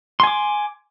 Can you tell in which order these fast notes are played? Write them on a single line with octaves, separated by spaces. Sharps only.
C6 G#5 D6